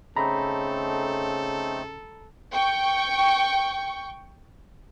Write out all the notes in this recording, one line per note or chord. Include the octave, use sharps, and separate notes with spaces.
C#3 A3 C4 D#4 A4 A#5 B5
G5 C#6